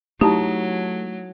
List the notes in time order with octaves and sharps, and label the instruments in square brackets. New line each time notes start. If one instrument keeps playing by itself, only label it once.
[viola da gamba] F#3 [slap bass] A3 [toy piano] D#4 E4 A5 [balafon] G4